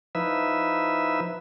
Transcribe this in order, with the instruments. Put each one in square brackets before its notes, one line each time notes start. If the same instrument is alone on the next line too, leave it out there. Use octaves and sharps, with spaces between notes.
[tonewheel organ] F3 D#4 E4 B4 E5